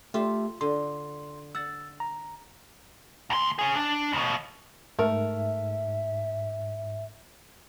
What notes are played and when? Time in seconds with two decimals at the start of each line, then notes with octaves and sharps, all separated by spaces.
0.14 A3 F4 G4 E5
0.61 D3 C6
1.55 F#5 E6 A6
2.00 A#5
3.30 D2 C6
3.59 C#4 G#4
3.76 D4
4.13 D#2 B2
4.99 G#2 A3 A#4 E5